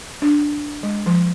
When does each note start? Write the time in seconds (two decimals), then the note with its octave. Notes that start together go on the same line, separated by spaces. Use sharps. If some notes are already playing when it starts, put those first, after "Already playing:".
0.22 D4
0.83 G#3
1.06 F3